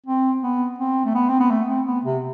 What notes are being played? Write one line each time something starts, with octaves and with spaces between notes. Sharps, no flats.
C4
B3
C4
A3
B3
C4
B3
A3
C4
B3
C3